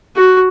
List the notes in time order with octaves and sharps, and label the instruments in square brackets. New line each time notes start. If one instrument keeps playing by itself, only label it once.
[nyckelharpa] F#4